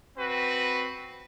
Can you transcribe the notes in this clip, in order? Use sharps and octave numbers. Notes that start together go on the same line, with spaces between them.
C4 F#4 B4